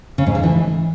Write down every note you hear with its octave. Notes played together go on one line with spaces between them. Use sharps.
C#3
G#2
D3
E3